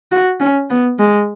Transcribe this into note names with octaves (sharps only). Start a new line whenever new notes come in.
F#4
C#4
B3
G#3